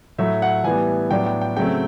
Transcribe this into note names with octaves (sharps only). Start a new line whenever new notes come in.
A2 F#3 A3 E5
F#5
A2 E3 G3 B3 G#5
A2 F#3 B3 D4 G5
G5
G5
C#3 F#3 A3 C4 G5